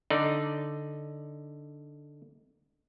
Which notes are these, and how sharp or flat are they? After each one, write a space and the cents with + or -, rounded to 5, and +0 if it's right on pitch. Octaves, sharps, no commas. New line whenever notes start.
D3 +0 D#4 -5 D5 +0